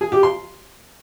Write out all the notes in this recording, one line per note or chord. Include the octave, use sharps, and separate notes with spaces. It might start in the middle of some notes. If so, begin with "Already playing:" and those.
G#4
G4
C6